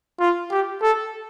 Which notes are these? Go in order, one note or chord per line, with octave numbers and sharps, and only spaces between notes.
F4
G4
A4